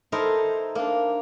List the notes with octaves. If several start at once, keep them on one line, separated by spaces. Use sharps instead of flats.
D#4 E4 A4 A#4 C5
A#3 D4